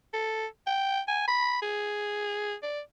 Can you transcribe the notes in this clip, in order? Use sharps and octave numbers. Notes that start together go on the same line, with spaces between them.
A4
G5
G#5
B5
G#4
D5